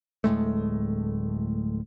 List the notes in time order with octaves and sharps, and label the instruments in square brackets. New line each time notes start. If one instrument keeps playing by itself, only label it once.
[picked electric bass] D1 A2 G#3 A3